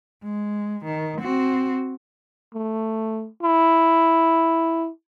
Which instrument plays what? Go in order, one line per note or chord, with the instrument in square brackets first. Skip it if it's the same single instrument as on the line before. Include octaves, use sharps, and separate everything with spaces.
[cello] G#3
D#3
C4 F#4
[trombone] A3
E4